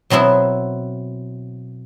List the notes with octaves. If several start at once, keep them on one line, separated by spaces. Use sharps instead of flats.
B2 F#3 C4 E4